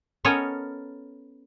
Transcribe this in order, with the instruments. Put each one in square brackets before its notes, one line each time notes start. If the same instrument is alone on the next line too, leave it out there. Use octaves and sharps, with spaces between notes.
[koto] B3 C#4 A4 A#4 C#5 D#5